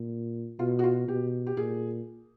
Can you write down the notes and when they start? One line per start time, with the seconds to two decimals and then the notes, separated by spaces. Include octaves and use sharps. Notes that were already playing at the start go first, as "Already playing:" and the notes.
Already playing: A#2
0.59 B2 F4
0.79 F#4
0.84 F4
1.08 B2 G4
1.47 G4
1.57 A#2 G#4